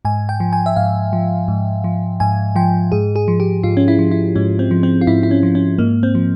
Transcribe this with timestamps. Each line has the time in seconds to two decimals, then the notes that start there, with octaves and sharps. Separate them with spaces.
0.05 G#2 G#5
0.29 G5
0.40 F3
0.53 G#5
0.66 E5
0.76 G#2 F5
1.13 F3
1.48 G#2
1.84 F3
2.20 G#2 G#5
2.56 F3 G5
2.92 G#2 G#4
3.16 G#4
3.28 F3
3.40 G4
3.63 G#2 F4
3.77 C#4
3.88 E4
3.99 F3
4.11 E4
4.36 G#2 C#4
4.59 C4
4.71 F3
4.83 C4
5.01 F4
5.07 G#2 E4
5.23 E4
5.31 C#4
5.43 F3
5.55 C#4
5.78 G#2 A#3
6.03 C4
6.15 F3